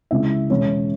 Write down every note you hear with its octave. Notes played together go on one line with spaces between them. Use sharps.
C#2 C#3 G#3 E4 E5
E2 B2 G#3 C#4 C#5